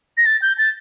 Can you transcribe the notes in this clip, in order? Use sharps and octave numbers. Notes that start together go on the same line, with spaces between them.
A#6
A6
G6
A6